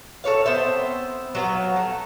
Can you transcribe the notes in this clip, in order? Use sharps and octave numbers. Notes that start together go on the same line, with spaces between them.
A4 B4 C#5 F5
B3 C4 C5 E5
F#3 B3 F5
A3